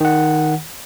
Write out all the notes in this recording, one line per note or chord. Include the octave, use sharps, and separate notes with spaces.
D#3 F#5